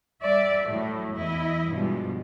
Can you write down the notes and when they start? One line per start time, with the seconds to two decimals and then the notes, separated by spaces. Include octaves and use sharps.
0.21 G3 D5 E5
0.63 A2 F#3 A3
1.14 E2 E4 D#5
1.68 G2 B2 F3 G3 G#3